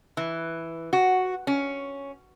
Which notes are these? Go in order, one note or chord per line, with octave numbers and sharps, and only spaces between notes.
E3
F#4
C#4